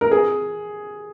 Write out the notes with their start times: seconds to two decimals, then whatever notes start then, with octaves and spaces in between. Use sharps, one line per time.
0.01 A#4
0.11 G#4